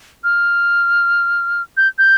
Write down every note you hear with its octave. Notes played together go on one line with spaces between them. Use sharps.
F6
G6
G6